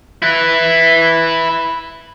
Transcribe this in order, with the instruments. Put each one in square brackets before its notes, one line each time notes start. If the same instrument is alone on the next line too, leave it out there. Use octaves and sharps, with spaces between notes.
[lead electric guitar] E4 B4